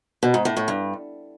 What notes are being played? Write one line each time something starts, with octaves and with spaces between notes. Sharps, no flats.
B2
G#2
A2
A2
G2